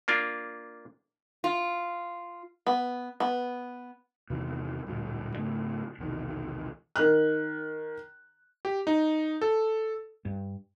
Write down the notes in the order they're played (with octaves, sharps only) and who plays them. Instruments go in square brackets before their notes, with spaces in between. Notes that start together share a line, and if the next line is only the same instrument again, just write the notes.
[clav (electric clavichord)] A#3 D4 F4
[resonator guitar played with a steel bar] F4
[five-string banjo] B3
B3
[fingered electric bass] E2 C3 D#3 E3
D1 G2 A#2 D3
G#2 C#3 A3 D4
B1 E2 C3 D#3
[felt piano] D#3 F#6
[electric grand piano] G4
D#4
A4
[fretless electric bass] G2